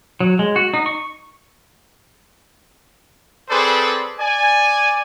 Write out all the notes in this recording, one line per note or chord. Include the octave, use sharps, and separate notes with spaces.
F#3
G#3
F#4
D#4
C#6
C4 G#4 A4 B4 C5 D5
D5 G#5